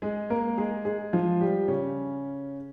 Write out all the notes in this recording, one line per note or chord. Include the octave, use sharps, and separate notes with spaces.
G#3 G#4
A#3 A#4
G#3 G#4
G#3 G#4
F3 F4
G3 G4
C#3 C#4